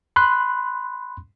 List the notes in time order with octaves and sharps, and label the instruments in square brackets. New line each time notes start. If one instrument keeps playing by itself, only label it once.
[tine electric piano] B5 C6 F#6